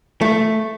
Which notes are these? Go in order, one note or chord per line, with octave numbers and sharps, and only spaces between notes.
A3